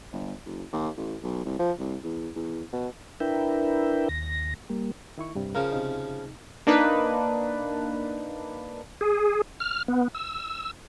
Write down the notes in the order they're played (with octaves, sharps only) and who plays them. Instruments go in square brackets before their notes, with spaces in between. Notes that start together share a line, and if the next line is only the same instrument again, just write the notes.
[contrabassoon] G1
F#1
D#2
A1
B1
C2
F3
C2
E2
E2
B2
[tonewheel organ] D4 E4 A#4 B4 E5 G5
D#2 A#6
G3 A#3
[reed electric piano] D#3 E4 C#6
G2 C3 G3
[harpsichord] C#3 F3 [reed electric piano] A#4
[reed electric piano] C3 D#4
[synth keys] A#3 D4 D#4 B4
[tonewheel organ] G#4
F6
B3
E6